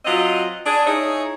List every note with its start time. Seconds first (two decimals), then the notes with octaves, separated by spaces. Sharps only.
0.05 F#3 C4 F4 D#5
0.65 D4 G#4
0.86 D#4 E4 G#4 C#5